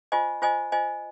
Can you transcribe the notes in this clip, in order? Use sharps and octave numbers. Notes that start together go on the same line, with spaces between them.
F4 C5 D#5 G#5
F4 C5 D#5 G#5
F4 C5 D#5 G#5